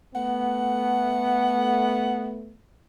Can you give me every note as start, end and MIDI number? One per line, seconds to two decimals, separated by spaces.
0.16 2.55 57
0.16 2.55 59
0.16 2.31 78